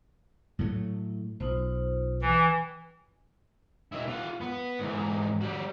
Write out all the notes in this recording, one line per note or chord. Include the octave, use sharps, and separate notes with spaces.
A2 F#3 A3
B1 D#4 F4 C5
E3 G5 G#5
B2 E4
F4 F#5
B3
G#2 E3
G3 F#4